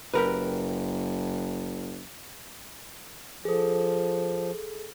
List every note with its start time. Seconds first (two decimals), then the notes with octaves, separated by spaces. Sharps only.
0.14 F#1 G4 A#4 B4
3.45 F3 G#4 A4